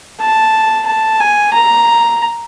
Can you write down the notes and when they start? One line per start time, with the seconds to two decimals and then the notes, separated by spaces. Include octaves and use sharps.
0.20 A5
0.86 A5
1.20 G#5
1.54 A#5